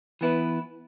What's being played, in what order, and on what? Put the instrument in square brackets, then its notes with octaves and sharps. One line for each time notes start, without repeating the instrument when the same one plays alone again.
[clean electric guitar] E3 B3 E4 B4